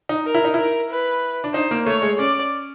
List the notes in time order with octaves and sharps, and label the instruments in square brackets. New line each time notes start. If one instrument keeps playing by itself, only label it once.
[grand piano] D#4
[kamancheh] A#4
[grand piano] E4
D#4
[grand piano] E4 [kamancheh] A#4
[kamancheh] B4
[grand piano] D4
[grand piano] D#4 [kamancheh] C5
[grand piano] A#3
[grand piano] A3 [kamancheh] C#5
[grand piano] G#3
[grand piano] C#4 [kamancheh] D5